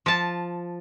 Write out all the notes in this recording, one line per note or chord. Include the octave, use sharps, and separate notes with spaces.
F3 A5